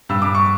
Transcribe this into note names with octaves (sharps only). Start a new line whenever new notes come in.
G2 E6
G2 D6
C#6